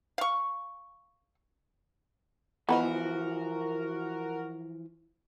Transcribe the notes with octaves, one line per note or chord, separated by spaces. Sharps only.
F5 C#6
E3 F3 B3 F#4 A#4 B4 D#5